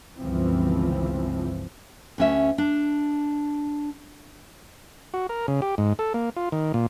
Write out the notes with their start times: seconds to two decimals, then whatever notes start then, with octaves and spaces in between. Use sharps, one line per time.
0.16 G1 C#2 E3 F3 C4
2.18 D2 C#4 E5
2.58 D4
5.14 F#4
5.29 A#4
5.48 C#3
5.62 G4
5.78 G#2
5.99 A4
6.14 A#3
6.36 F4
6.52 D#3
6.74 A#2